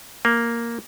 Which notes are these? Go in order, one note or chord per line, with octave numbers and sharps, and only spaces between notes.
A#3